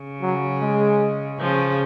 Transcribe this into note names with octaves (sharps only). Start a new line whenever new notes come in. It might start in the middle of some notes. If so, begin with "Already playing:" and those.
Already playing: C#3
F#3
G#3
C#3 F3